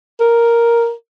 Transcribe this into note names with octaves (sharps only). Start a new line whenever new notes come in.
A#4